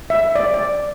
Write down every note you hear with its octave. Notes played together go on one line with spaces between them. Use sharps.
E5
D5
D5